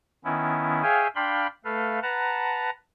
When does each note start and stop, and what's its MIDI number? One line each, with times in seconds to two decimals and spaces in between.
0.25 0.82 51
0.25 0.82 59
0.25 0.82 61
0.25 0.82 64
0.83 1.08 68
0.83 1.08 73
0.83 1.08 76
0.83 1.08 77
0.83 1.08 79
0.83 1.08 80
1.15 1.47 62
1.15 1.47 77
1.15 1.47 79
1.15 1.47 83
1.15 1.47 84
1.65 2.00 57
1.65 2.00 69
1.65 2.00 71
1.65 2.00 77
2.03 2.70 71
2.03 2.70 78
2.03 2.70 81
2.03 2.70 82